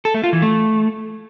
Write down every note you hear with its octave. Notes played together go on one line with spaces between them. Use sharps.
A4
A3
F4
E3
A3